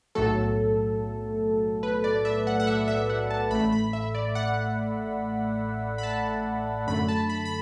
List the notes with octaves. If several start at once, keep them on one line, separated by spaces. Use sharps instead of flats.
B1 A2 F#3 A3 A4
B4
D5
E5
F#5
F#5
E5
E5
F#5
A5
A1 A2 A3 B5
B5
E5
D5
F#5
B5
A5
F#2 D3 A3 B5
A5
B5
B5